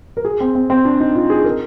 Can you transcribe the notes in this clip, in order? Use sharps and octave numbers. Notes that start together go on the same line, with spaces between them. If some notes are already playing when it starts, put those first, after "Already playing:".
A#4
G#4
C4
C4
C4
D4
D#4
F4
G#4
A#4